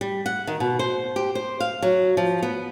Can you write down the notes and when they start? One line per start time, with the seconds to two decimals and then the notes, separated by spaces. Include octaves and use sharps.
0.01 G3
0.26 F#5
0.47 D#3
0.60 B2
0.79 C5
1.16 G4
1.35 C5
1.60 F5
1.82 F#3
2.17 F3
2.43 B3